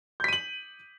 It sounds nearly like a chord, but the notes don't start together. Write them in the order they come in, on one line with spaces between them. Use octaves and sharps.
G6 B6 D#7 F#7